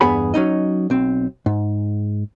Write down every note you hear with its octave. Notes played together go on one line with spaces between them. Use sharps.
E2 G2 B3 G#4 B5
F#3 C#4 D#4 D#5
B1 C4
G#2